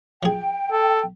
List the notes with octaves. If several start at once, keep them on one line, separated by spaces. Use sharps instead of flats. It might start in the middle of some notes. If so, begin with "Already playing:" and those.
F3 G#4 G5
A4